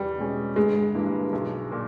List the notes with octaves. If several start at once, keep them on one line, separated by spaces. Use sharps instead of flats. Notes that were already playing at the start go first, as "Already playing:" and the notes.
Already playing: E2 G3
B2 G#3 C#4
G1 G#3
G2 E3 G3 A#3
B1
A#2 A#3